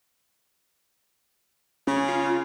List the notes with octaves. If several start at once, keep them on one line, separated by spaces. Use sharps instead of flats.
C#3 C#4
F4